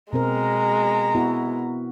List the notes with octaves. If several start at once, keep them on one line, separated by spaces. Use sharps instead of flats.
B2 G#3 C4 A#4 A#5
B3 E4 F#4